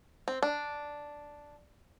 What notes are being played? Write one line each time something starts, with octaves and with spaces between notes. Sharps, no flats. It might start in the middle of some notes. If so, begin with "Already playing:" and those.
C4
D4